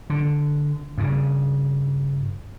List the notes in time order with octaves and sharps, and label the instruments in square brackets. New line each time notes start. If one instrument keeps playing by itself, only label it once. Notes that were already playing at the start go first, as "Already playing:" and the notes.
[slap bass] D3
G2 C#3